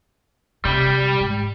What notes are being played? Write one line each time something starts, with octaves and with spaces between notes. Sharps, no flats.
C3 G3
G#2